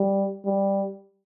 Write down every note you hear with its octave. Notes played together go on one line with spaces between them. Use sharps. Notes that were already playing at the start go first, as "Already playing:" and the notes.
Already playing: G3
G3